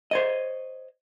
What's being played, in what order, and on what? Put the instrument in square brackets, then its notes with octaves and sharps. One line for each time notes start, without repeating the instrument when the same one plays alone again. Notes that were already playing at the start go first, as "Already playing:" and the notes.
[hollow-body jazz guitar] C5 C#5 D#5